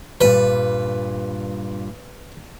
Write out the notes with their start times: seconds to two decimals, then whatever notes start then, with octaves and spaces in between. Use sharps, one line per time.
0.21 G2 A#2 G3 B4